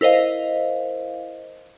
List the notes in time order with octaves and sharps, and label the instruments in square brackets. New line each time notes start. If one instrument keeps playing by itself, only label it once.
[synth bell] E4 A#4 C5 D#5 F5